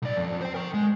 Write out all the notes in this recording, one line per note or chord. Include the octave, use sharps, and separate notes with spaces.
B1 D5
F2
C5 G5
A#4 G5
G#3